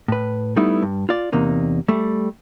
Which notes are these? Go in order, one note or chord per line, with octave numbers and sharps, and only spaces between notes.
A2 B4
G3 A3 B3 D#4 E4
G2
F4 D5
E2 C3 A#3 D#4
G3 A3